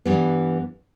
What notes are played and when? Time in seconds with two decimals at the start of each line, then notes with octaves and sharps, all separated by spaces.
0.05 G2 E3 G3 B3